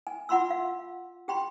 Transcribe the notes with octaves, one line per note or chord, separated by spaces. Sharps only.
G#5
F4 F#5 B5 C6 E6
F5
G4 G5 B5 C6